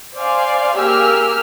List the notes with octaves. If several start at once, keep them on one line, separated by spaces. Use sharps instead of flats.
C5 D5 F5 G#5
A#3 G4 G#4 E6 F6